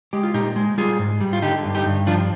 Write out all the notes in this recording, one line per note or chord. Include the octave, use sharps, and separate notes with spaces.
G#3 G4
F4
A#2 D#4 G4
G#3
G3 F4 G#4
G#2
G3
F4
D3 D#4 G4
G2
D#4 G4
G2
F3 D4 F4